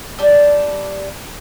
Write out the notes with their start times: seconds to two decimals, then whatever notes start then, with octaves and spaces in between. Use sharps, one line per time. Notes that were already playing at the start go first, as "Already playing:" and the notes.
0.19 G3 D4